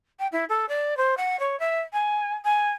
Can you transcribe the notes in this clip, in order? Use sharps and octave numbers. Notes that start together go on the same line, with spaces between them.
G5
E4
A4
D5
C5
F#5
C#5
E5
G#5
G#5